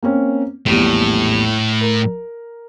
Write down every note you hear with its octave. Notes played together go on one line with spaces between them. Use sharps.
A#3 C4 C#4
A#1 E2 A2 G3
A#4